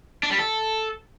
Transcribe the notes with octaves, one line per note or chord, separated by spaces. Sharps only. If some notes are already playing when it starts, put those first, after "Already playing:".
D4
G3
A4